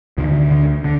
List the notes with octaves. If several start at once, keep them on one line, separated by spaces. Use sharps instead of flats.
D2 D3 D#3
D3
D3